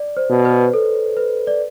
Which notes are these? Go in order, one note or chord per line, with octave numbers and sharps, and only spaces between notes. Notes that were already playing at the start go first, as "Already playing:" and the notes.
Already playing: D5
C5
B2
B4
A4
B4
D5